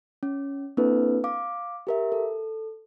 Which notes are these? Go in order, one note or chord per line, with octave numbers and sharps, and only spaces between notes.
C#4
A#3 C4 D4 E4 A4 B4
F5 D6
G4 A#4 E5
A4